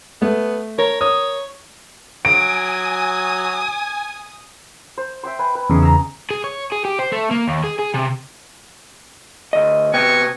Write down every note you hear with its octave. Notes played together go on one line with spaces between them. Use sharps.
A3 B3
A#4 C#5
C#5 D#6
F#3 G#5 D#6 D7
C5
E5 G5 C6
B4 G#5
B4
E2 C#3 D#4 G#4
A#5 E6
G#4
C#5
G#4
G4
C5
A3
A#3
D#2
G#4
G#4
C3
D2 D#5
C3 B3 D#5 G5 G#5 C#6